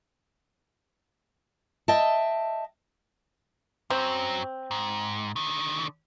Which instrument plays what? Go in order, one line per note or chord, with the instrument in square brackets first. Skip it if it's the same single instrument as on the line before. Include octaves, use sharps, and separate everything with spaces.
[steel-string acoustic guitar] D#5 E5 G5 A5
[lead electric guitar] F#2 F#3 [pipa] C4
[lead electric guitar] G#2
D3 D#3